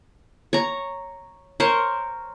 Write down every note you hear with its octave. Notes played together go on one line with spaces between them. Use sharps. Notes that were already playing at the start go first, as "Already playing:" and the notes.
C#5 A#5
A#4 C5 C#5